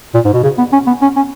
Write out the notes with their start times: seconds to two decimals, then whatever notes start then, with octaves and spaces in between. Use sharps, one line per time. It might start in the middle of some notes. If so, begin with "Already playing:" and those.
0.14 A#2
0.25 G#2
0.34 B2
0.43 C#3
0.58 B3
0.72 C#4
0.87 B3
1.02 C#4
1.16 C#4